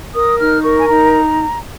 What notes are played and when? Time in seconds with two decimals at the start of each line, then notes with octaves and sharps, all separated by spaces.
0.14 A#4 D#6
0.38 D#4 F6
0.63 A#4 C#6
0.78 G#5
0.88 D#4 A#5